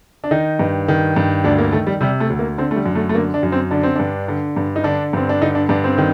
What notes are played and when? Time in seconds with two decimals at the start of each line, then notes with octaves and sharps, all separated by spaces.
0.24 D4
0.31 D#3 D#4
0.59 G2
0.88 D#3
1.16 G2
1.44 D2 D4
1.58 A#3
1.72 D#3 A3
1.87 G3
2.01 C3 G3
2.20 A3
2.30 D2
2.39 A#3
2.58 D3 C4
2.71 A3
2.76 G3
2.86 F#2
2.95 A3
3.09 A3
3.14 D3 A#3
3.34 D4
3.43 F#2
3.52 C4
3.71 D3 D4
3.83 C4
3.96 G2 D4
4.28 D3
4.56 G2
4.76 D#4
4.84 D3 D4
5.13 G2 C4
5.29 D4
5.42 D3 D#4
5.55 D4
5.69 G2 D4
5.84 C4
5.98 D#3